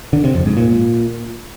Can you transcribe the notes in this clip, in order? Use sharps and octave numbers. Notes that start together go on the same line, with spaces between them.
D3
C3
F2
G#2
A#2